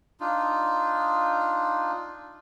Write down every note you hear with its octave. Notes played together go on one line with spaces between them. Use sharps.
D4 D#4 F4